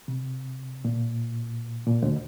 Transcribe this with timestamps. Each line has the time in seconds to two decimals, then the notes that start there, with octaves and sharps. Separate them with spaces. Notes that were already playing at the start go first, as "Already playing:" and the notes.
0.08 C3
0.85 A#2
1.87 A#2
2.02 D2 D3